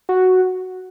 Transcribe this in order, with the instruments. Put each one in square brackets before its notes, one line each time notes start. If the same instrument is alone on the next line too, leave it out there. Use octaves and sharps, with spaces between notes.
[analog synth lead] F#4